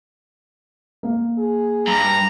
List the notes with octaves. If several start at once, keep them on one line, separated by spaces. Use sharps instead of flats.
A#3
G#4
G2 A#5